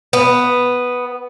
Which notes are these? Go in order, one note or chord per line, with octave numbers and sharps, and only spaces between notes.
B3